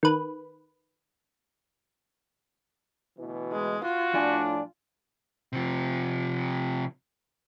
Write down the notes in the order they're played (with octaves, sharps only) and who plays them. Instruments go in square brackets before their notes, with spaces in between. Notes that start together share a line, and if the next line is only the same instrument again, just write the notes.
[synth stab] D#3 B4
[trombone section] D2 B2 E3
[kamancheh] G#3
[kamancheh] F4 [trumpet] F#4
[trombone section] A2 D4 [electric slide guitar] F3 D5 G#5
[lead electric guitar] C3 F3